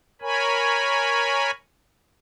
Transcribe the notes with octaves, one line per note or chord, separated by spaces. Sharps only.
A#4 C#5 G#5 B5